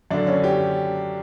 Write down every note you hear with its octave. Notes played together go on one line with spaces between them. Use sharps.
F#2 D3 D4
C#4
G4